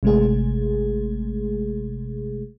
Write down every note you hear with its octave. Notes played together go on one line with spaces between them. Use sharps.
G#1 C3 G#3 A3 G#4